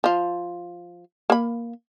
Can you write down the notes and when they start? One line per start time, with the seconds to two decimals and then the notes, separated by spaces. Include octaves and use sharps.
0.04 F3 F4
1.30 A#3 B5